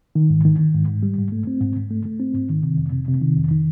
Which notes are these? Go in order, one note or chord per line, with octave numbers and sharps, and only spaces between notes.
D#3
G#2
D#3
D#3
G#2
G#2
G3
G#2
A3
C4
G#2
G#2
A3
A3
C4
G#2
D#3
C3
F2
C3
C3
D#3
F2
D#3